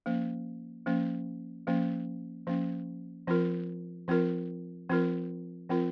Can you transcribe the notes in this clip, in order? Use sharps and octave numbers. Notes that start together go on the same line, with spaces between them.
F3 A#3 C#4
F3 A#3 C#4
F3 A#3 C#4
F3 A#3 C#4
F3 C4 F4 A#4
F3 C4 F4 A#4
F3 C4 F4 A#4
F3 C4 F4 A#4